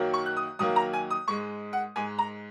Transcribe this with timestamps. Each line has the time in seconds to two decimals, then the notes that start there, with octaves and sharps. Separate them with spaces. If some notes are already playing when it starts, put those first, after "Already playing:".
Already playing: F#2 D#3 F#3 A#3
0.14 C#6
0.26 F#6
0.37 D#6
0.59 F#2 D#3 F#3 A#3 D#6
0.76 A#5
0.93 G#5
1.10 D#6
1.28 G#2 G#3 C#6
1.73 F#5
1.96 G#2 G#3 G#5
2.19 A#5